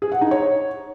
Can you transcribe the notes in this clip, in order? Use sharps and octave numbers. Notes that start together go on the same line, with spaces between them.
G#4
F#5
D#4
C#5